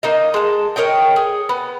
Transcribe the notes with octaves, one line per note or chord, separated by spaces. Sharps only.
A#3 D#4 D#5
G#3 A5
A#4 C#5 D#5 G5
G#4
B3